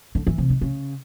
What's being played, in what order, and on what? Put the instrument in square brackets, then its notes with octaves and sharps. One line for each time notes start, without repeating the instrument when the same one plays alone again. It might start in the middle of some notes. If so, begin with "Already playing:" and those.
[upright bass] D3
E3
C3
D#3
C#3